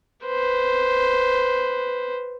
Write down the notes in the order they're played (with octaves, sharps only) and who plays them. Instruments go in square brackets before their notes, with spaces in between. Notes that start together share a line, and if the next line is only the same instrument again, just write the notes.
[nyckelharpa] B4 C5